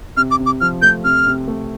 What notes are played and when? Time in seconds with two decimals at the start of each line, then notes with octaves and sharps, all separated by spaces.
0.17 C3 F6
0.31 D6
0.39 C3
0.46 D6
0.61 F3 F6
0.82 A3 G6
1.04 C3 F6
1.27 C3
1.48 A3